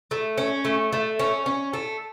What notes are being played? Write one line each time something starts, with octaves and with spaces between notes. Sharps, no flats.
A3
C#4
A3
A3
C#4
C#4
A3